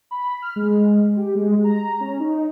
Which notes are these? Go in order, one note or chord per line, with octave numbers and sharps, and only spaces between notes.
B5
F6
G#3
G4
G#3
A#5
C#4
D#4